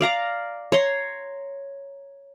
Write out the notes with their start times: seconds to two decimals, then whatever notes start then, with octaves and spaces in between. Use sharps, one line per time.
0.01 D5 F5 A#5 D6
0.72 C#5 A#5 C6